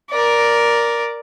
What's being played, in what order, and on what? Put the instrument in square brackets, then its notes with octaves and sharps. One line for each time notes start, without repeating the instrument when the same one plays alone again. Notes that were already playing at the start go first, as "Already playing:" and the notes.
[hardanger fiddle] A#4 D5